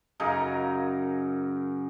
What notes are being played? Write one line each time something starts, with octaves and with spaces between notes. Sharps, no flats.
F#2 C#3 D#4 A#4